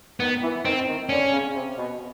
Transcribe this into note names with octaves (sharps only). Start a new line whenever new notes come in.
D#3 B3
E3
D#3 C4
D#3
D3 C#4
C#3
C3
B2